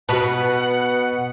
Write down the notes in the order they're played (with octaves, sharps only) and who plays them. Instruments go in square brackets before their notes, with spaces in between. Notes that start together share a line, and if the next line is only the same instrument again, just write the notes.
[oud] B2 [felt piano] F#4 A5 [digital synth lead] B4 [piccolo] F#5